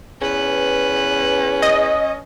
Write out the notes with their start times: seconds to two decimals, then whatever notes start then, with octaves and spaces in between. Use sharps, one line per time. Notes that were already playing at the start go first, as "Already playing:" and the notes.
0.21 E2 C#4 B4
1.62 D#5